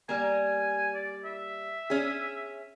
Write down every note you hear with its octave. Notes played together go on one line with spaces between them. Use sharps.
G3 A#3 G#5
D5
E5
C#4 G#4